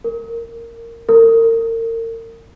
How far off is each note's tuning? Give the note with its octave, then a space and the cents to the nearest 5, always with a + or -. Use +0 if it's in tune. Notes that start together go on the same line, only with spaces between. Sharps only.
A#4 -10
A#4 -35